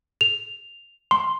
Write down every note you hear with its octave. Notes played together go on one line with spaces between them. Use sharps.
F7
C6